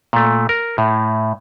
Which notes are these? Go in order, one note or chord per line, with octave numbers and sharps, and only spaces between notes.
A#2 A3
A#4
A2